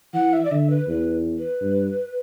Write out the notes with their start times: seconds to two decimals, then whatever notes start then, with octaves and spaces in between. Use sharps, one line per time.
0.13 E3 F#5
0.32 E5
0.44 D5
0.51 D3 E5
0.70 B4
0.88 E2 B4
1.38 B4
1.62 G2